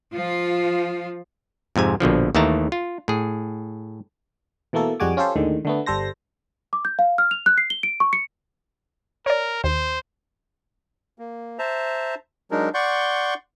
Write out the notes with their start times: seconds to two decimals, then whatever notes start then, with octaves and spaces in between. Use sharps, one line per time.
0.12 F3 F4
1.76 F2 G#2 C3 G#5
2.00 A#1 B2 D3 F3
2.35 D#2 D#3 E3 A3 A5 A#5
2.72 F4
3.08 A2 G#4
4.73 B2 E3 A3 A#3 A4
5.00 F2 G3 G#3 F#4 G#5 D6
5.17 C#4 F4 G4 A4 C5
5.36 D#2 A2 D3 D#3 G#3
5.65 D3 A3 B3
5.86 G1 G3 A4 C5 A#6
6.73 D6
6.85 G6
6.99 F5
7.18 F6
7.31 F7
7.46 F#6
7.58 C7
7.70 G7
7.83 D7
8.00 C#6
8.13 C#7
9.26 A#4 C#5 D5
9.64 D#2 C5
11.19 A#3
11.59 C5 E5 A5 A#5
12.51 F#3 G#3 D4 D#4 A#4
12.74 D5 F#5 C6 C#6 G6